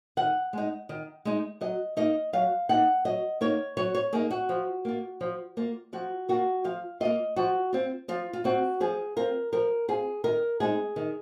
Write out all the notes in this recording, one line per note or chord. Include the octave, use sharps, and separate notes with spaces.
D#3 F#5
G#3 D#4
D#3
G#3 D#4
F#3 D#5
A#3 D#4 D#5
F#3 F5
A#3 D#4 F#5
F#3 D#5
A#3 D#4 C#5
F#3 C#5
C#5
A#3 D#4 G#4
F#4
F3
A#3 F4
F3
A#3 F4
F3 F#4
A#3 F4 F#4
F3 F5
A#3 F4 D#5
F3 F#4
C4 F4
F3 F4
F4
C4 F4 F#4
F3 G#4
C4 F4 A#4
F3 A#4
C4 F4 G#4
D#3 A#4
G#3 C4 D#4 G#4
D#3